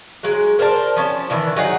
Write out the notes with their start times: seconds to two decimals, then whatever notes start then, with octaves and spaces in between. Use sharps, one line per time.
0.23 F#3 G#3
0.59 A#4 C5 D5 A5
0.96 F3 C#4 A5
1.30 D#3 E3 D4
1.56 F#3 D#4 G#4 F#5